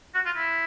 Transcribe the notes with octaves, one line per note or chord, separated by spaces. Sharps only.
F#4
F4
E4